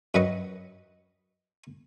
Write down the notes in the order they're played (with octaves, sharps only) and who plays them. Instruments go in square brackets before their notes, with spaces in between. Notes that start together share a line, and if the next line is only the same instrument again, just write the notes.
[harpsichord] F#2 B4 D#5 C#6